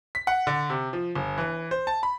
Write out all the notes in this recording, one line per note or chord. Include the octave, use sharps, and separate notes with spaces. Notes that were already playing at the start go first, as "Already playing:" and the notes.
B6
F#5
D3
C3
F3
G1
E3
C5
A5
B5